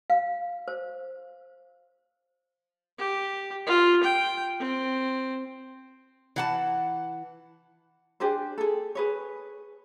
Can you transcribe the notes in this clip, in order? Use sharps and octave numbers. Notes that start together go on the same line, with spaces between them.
F5
C5
G4
F4
G5
C4
E3 F#5 A5
D4 G4 G#4 C5
G#4 A4
G#4 B4 C#5